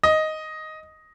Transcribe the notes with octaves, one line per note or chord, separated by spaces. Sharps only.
D#5